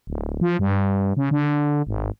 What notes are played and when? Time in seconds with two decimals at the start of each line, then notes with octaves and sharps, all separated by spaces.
0.07 D1
0.41 F3
0.59 G2
1.17 C#3
1.31 D3
1.87 G#1